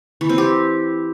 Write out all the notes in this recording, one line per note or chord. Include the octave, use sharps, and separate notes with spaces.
E3
C4
G4